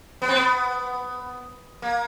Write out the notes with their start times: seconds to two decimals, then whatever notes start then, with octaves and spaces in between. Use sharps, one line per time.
0.22 B3
0.29 C4
0.35 B3
1.82 A#3